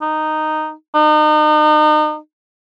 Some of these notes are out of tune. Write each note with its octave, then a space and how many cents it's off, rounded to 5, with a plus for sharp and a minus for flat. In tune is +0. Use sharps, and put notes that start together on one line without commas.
D#4 -5
D#4 -35